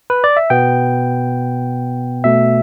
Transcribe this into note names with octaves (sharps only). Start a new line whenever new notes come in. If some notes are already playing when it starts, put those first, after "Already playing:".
B4
D5
E5
B2 B3 G5
B2 A3 E5